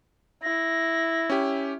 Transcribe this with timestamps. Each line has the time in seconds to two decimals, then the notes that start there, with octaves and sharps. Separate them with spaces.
0.43 E4 A#6
1.30 C#4 G4